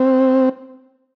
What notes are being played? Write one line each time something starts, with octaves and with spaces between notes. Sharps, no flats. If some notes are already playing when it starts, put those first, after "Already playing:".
Already playing: C4